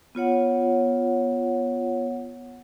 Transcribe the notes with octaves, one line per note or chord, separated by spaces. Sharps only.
B3 F4 C#5 F#5